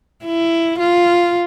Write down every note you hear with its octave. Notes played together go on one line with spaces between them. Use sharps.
E4
F4